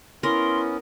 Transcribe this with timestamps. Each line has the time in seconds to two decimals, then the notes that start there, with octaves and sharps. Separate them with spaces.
0.23 B3 C#4 E4 A#4 C6